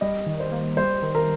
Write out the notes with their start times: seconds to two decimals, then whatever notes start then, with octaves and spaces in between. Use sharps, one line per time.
0.01 G3 D#5
0.26 D#3
0.40 C5
0.52 A#3
0.77 G3 C5
1.02 D#3
1.15 A#4